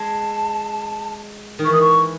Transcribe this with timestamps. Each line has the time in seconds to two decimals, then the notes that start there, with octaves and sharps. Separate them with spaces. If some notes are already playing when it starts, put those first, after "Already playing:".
Already playing: G#3 A5
1.59 D#3
1.65 E3 C#6
1.73 D#6
1.81 C#6